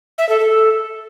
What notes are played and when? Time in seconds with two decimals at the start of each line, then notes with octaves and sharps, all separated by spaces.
0.18 E5
0.29 A4
0.40 A4